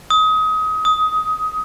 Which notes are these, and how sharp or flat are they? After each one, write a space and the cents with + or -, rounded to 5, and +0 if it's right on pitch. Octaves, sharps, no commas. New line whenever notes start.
D#6 +25
D#6 +15